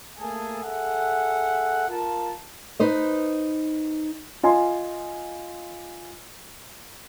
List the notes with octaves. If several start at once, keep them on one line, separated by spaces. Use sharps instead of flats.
A3 A#3 G#4 A4 G#5 A5
G#4 A4 E5 F#5
F4 A#4 A5
D#4 B4 C5 D#5
F4 D#5 G#5 C6